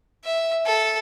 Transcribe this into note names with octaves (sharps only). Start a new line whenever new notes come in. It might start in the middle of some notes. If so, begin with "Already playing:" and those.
E5
A4